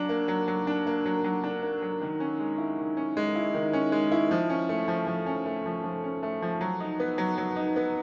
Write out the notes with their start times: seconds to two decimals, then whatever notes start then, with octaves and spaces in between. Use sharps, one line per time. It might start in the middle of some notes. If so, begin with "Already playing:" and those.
Already playing: F#3 D4
0.09 A#3
0.28 F#3
0.48 F#3
0.67 D4
0.87 A#3
1.06 F#3
1.24 F#3
1.44 D4
1.62 A#3
1.82 F#3
2.01 D#3
2.20 C#4
2.40 G#3
2.58 E4
2.78 D#3
2.97 C#4
3.17 G#3
3.36 E4
3.54 D#3
3.73 C#4
3.92 G#3
4.12 E4
4.31 F3
4.50 C#4
4.69 A3
4.88 F3
5.07 F3
5.26 C#4
5.46 A3
5.66 F3
5.84 F3
6.04 C#4
6.23 A3
6.42 F3
6.61 F#3
6.80 D#4
7.00 B3
7.18 F#3
7.38 F#3
7.56 D#4
7.76 B3